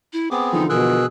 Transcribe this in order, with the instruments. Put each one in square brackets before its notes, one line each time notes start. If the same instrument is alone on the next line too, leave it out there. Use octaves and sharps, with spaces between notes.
[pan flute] E4
[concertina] B3 C4 G#4 [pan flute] D6
[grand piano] D3 E3 F3 [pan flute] D#4
[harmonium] B2 [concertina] G#4 E6 F#6 [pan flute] A#4